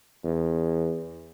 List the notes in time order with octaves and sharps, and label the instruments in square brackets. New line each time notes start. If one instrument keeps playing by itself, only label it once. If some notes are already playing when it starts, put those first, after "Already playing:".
[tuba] E2